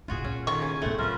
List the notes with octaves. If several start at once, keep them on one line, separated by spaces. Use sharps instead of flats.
F1 A2 F4 F#4 G#4
A#2 C#4
A2 D#3 F4 C#6
C#3 G#5
B1 A2 A3 C4 F#5
F#3 C#4 F4 A#4 B4 E5